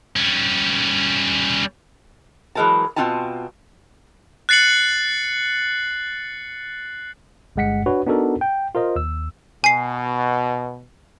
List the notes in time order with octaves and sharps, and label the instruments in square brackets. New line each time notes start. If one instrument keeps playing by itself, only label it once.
[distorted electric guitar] G3 C#4
[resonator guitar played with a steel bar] E3 F#3 G#3 A#4 C5 A5
B2 C4 E4 F4 G#5 A5
[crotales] F#6 A6 C7 C#7 F#7
[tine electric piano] G1 G2 G#3 F#5 B6 C#7
D4 F#4 B4 C#5
B3 D4 D#4 F#4 A4 A#4
G5
F4 A#4 C5 D#5
D#2 E6
[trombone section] B2 [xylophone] G#5 C7